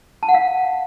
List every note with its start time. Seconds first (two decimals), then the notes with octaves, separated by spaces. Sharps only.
0.23 A5
0.28 F#5
0.34 F5